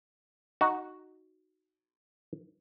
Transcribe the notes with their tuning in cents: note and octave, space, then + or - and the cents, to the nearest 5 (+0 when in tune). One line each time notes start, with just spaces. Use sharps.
D#4 +0 F#4 +0